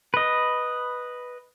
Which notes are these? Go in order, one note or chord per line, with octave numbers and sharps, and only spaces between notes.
B4 D#5